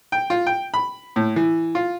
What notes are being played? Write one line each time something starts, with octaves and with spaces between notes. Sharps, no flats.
G5
F4
G5
B5
A2
E3
F4